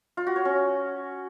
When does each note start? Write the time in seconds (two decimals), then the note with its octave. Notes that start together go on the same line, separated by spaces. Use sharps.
0.17 F4
0.27 F#4
0.36 C#5
0.45 C#4